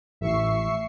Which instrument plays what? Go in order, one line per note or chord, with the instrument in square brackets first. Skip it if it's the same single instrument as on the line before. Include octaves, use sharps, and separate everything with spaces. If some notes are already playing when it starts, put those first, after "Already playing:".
[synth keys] A1 A2 [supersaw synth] E5 C#6 C7